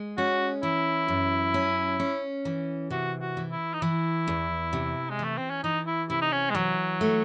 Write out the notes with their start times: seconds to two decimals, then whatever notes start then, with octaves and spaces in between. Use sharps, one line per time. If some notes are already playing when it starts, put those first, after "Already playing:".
Already playing: G#3
0.17 C#4 F#4
0.63 E3 E4
1.08 F#2
1.54 C#4
2.00 C#4
2.45 E3
2.90 C3 F#4
3.21 F#4
3.37 E3
3.51 E4
3.73 D#4
3.81 E3 E4
4.27 E2
4.73 C3
5.10 G#3
5.19 E3 A3
5.37 C4
5.50 C#4
5.63 E3 D#4
5.87 E4
6.10 C3 E4
6.21 D#4
6.32 C#4
6.50 G#3
6.55 E3 F#3
7.01 A3